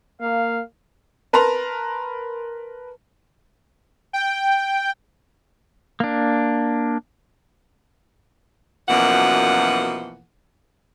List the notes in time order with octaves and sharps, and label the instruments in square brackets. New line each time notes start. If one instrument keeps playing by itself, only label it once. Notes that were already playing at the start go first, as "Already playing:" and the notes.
[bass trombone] A#3 [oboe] F5
[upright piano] A#4 B4 A5 A#5 C6
[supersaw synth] G5
[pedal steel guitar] A#3 D4
[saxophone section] F#2 B2 E3 F3 A#3 F#5